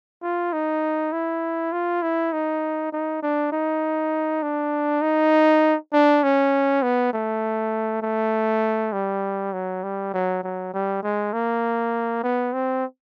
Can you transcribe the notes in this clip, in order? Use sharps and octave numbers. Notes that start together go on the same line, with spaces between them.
F4
D#4
E4
F4
E4
D#4
D#4
D4
D#4
D4
D#4
D4
C#4
B3
A3
A3
G3
F#3
G3
F#3
F#3
G3
G#3
A#3
B3
C4